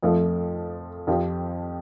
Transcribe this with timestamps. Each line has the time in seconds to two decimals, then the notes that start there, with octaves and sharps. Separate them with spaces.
0.03 F2 F3 A3
1.07 F2 F3 C4 G4